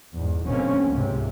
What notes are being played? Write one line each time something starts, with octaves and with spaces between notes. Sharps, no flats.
E2 G#2
F#1 B2 D3 A#3 C4 C#4
C#2 G#2 C3